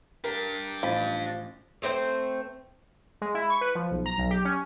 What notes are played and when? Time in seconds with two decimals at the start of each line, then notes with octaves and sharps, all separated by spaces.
0.24 D4 G4 A#4
0.83 A1 F3 B5
1.82 A3 C4 D4 C5
3.22 G#3
3.35 E4
3.50 C#6
3.61 B4
3.75 F3
3.91 B1
4.06 A#5
4.18 B1
4.31 G4
4.45 C#4